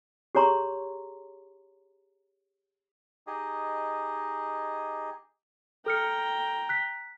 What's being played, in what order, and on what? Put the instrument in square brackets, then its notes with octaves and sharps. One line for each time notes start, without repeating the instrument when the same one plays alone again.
[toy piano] G4 G#4 C#5 A#5 C6 C#6
[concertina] D#4 G4 G#4 D#5
[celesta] A4 F6 C#7 [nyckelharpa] G5 A#5
[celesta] F#6 B6